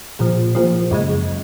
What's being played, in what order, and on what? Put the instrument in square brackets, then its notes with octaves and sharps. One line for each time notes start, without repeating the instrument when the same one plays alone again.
[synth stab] A#1 A#2 F3
A#1 A#2 F3
F#2 C#3 G#3